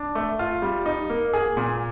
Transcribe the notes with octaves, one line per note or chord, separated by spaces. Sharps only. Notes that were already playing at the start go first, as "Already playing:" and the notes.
Already playing: D4
A3
F4
G3
D#4
A#3
G#4
A#2